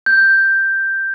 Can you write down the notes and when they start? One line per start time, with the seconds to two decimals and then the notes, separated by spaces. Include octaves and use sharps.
0.06 G6